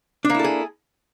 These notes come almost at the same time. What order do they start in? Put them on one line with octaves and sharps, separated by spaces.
D4 A#3 E4 A4 G#4